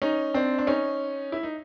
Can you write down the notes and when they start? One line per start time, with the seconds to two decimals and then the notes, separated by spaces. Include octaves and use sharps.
0.02 C#4 D#4
0.34 C4 D4
0.59 D4
0.67 C#4 D#4
1.32 E4
1.43 D#4